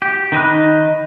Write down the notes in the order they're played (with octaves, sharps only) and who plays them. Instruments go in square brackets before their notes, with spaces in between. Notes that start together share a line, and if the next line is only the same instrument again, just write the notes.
[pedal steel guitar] G4
D#3 D#4 D#5 B5 F#6